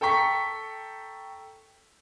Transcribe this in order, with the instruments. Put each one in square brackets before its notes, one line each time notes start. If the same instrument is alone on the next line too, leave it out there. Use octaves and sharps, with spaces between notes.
[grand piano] A4 G5 A#5 C#6 B6